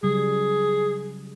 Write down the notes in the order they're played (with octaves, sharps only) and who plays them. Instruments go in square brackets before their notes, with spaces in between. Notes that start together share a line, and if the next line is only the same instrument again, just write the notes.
[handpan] C#3 F#3 G3 [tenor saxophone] G#4